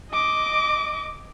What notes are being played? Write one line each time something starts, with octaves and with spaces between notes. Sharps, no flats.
D#5 D6